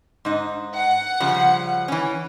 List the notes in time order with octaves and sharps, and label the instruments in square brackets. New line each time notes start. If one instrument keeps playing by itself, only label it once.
[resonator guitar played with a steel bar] G#2 D#4
[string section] F#5
[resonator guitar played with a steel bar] C#3 F3 G3
E3 C#4